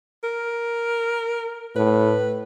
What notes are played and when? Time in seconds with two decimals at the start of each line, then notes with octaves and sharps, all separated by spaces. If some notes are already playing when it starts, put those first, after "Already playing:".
0.23 A#4
1.76 A2 B4